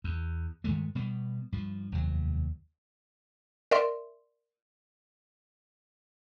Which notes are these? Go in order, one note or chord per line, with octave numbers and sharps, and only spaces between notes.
E2
G2 D#3 G#3 A3
B2 G3 B3
G2 F3
F1 D#2 F#3
A#4 D5 E5 C6